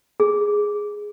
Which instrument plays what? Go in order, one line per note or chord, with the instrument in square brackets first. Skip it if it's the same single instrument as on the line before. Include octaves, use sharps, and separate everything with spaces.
[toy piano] G#4